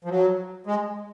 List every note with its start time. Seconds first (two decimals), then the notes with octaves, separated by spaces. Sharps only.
0.04 F3
0.09 F#3
0.66 G#3